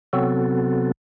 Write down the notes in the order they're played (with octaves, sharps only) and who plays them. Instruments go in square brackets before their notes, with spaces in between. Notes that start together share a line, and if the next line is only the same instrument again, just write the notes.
[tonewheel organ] C3 F#3 B3 C4 F#4 A4